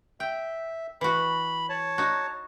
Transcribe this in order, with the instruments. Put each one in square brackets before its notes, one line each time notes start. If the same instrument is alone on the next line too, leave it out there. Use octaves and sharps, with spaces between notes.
[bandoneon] E5 [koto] G5
[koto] E3 F#4 [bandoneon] B5
[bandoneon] C#5 A5
[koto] D#4 F#4